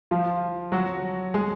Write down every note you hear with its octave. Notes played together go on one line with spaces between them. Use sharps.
F3 F4
F#3 F#4
G#3 G#4